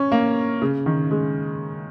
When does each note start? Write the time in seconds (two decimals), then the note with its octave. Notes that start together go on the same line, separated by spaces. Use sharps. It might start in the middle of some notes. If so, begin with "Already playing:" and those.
Already playing: C#4
0.12 A#3
0.62 C#3
0.86 D#3
1.11 G#3